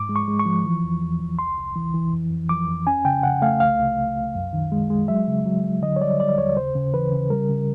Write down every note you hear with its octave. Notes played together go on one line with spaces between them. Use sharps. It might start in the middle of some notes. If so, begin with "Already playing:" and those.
Already playing: G#2 D6
G#3
C#6
G#3
C#6
F3
E3
E2
E2
E2
C2 C6
C2
E3
E3
F2
F2
F3 D6
F2
C#4 G#5
C#3 G5
C#3 F#5
A3 F5
C2 F5
C2
C2
C2
F#2
D#3
G#3
G#3
F#3 E5
C#3
F#3
F#3
D3 D#5
C#5
G3 D5
G3 D5
D#2 C#5
C#3 C5
C#3
E3 B4
C#3
G3 A#4
C#3